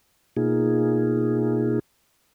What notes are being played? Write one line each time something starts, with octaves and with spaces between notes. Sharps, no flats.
B2 A#3 D#4 F4 G#4